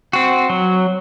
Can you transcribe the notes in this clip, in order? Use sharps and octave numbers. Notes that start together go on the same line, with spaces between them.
C4 F#4
F#3